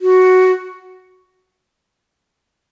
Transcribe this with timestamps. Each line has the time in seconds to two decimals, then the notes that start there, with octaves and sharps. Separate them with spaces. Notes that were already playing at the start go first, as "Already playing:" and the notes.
0.01 F#4